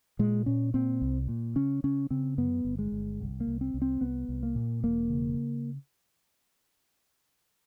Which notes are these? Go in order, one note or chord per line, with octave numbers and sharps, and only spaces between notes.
A#2 G#3
A#2 C#4
A#2 C4
C2
A#2
C#3 C#4
C#3 C#4
C#3 C4
F#2 B3
G1
G#3
G1
C2
A#3
C2
C4
C2
C4
C2 B3
C2
A#3
A#2
E1 A#3
C#3